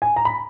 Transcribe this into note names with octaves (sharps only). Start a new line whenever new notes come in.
G#5
A#5
B5